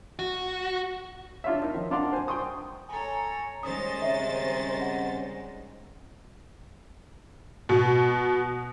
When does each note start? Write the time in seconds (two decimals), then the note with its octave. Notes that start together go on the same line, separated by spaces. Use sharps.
0.19 F#4
1.44 D4 F4 C#5 E5
1.62 D#4 A#4
1.74 D#3 F3
1.91 D4 A#4 F5 F#5 C6 D6
2.13 C5 G#5
2.28 G5 C6 C#6 D#6
2.89 A4 C#5 G#5 A#5
3.63 D#3 G3 G#3 C#4 C5 D#6 A6
4.02 C#3 G3 C4 C#5 D#5 E5
4.81 F#5
7.69 B2